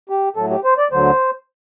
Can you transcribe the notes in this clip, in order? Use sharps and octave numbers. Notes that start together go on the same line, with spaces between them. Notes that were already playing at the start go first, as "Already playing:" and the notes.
G4
A2 F#3 A3 A4
G4
C5
D5
D2 D3 F#3 C5